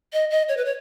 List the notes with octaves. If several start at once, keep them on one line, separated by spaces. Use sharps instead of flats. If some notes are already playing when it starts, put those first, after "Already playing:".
D#5
D#5
C#5
B4
C#5